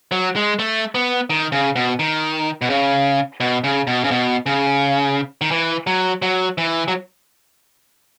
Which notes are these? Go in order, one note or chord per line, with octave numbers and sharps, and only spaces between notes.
F#3
G#3
A3
B3
D#3
C#3
B2
D#3
B2
C#3
B2
C#3
B2
C#3
B2
C#3
D#3
E3
F#3
F#3
E3
F#3